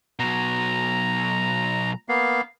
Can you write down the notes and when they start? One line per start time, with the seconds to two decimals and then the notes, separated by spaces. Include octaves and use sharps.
0.19 B2 F#3 A#5
2.09 A#3 B3 F5